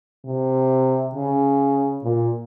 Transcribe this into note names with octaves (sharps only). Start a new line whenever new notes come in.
C3
C#3
A#2